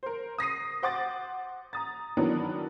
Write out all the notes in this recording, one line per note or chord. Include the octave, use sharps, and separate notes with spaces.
A#4 C5
D#6 A#6 C7 D#7
C5 F#5 D6 A6
A#5 D#6 A6
D#3 E3 F#3 B3 D4 A#4